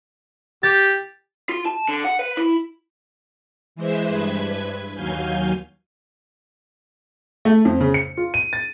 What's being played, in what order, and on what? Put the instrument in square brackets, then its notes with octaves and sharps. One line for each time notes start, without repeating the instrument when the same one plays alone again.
[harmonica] G4 [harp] A6
[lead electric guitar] F4
A5
D3
F#5
B4
E4
[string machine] E3 G#3 C5 E5 E6
G2 B4 G#6
D#2 F#3 F5 G#5 G6
[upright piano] A3
F2
C#3
C#7
F4
D#7
A6